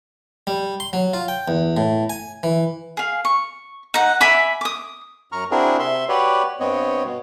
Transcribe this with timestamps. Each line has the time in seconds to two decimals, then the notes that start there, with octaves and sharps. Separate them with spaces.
0.47 G3
0.80 C6
0.93 F#3
1.14 F4
1.28 G5
1.48 E2
1.77 A2
2.10 G#5
2.43 E3
2.97 G#4 F5
3.25 C#6
3.94 D#4 F#5
4.20 E5 G#5 B5 D6
4.61 D6 D#6
5.32 F#2 A#5 C#6 F6
5.51 C4 D4 E4 F#4 G#4 A#4
5.79 C3 E5 C6
6.09 F#4 G4 B4 C#5 D5
6.60 G2 B3 C4 C#5 D#5
7.05 B2